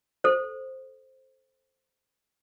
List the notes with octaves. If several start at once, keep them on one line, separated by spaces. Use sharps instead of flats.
A4 C5